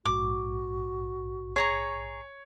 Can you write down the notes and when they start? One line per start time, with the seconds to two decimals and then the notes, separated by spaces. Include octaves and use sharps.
0.05 A#1 G#2 F#4 D6
1.56 G#4 C#5 A#5 C#6